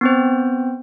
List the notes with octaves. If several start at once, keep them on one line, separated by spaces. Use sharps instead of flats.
B3 C4 C5